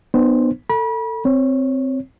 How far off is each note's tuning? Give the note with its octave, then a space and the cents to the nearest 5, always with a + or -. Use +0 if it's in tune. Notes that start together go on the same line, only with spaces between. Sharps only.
B3 +0 D#4 -45 C5 +5
A4 +25 B5 -40
C4 +0 C#5 +0